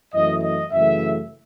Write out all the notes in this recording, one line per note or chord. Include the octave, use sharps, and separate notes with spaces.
F#2 E3 A3 D#5
D#5
F#2 C#3 E3 A3 E5